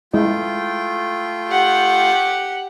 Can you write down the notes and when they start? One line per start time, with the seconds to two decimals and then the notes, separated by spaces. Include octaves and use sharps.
0.14 G#3 A3 E4 F4 D#5 G5
1.48 G4 F#5